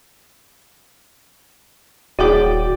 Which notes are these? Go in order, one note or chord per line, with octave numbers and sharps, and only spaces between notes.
D#1 E4 F#4 G#4 C#5 D5 G5 D6